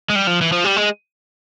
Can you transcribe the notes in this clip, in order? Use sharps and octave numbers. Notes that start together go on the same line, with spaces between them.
G#3
G3
F3
E3
F3
G3
G#3